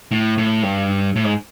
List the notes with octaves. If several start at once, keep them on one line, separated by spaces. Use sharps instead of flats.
A2
A2
G2
A2
G#2